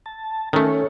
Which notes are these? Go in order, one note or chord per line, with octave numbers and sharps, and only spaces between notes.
A5
D#3 A3 C#4 A4 C#5